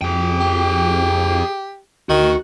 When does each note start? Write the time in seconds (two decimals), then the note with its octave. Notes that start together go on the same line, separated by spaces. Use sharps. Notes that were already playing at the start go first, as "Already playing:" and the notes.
0.01 F2 G#4 G5
0.40 G4
2.09 D2 D#3 F#4